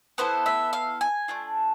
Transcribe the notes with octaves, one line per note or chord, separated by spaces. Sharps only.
B3 E4 A4 C5
E5
F5
G#5
A3 D4 F4